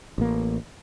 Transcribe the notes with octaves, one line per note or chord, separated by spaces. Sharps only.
A1 A#3